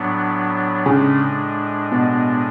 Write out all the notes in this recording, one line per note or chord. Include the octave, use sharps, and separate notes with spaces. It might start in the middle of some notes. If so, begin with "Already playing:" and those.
Already playing: A2 F#3 B3 D4
A2 C#3 G#3 D4
B2